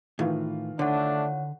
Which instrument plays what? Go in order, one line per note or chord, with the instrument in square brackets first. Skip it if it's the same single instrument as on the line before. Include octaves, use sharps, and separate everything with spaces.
[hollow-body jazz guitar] A2 [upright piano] D#3 E3 F4
[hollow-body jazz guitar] D3 [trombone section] A3 D4 [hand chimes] C#5 F#5